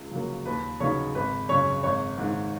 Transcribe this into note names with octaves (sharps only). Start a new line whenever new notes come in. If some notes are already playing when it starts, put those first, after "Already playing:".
Already playing: C#2
C#3 F#3 A#3
D#2 B4
C#3 F#3 B3 D#4 C#5
G#1 B4
F#2 C#3 C#5
G#1 C#5
G#2 D#3